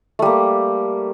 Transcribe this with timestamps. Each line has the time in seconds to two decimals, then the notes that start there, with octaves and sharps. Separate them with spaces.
0.19 A3
0.22 G3
0.26 A#3